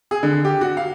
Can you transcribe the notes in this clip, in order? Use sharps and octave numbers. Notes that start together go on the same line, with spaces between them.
G#4
D3
G4
F#4
F5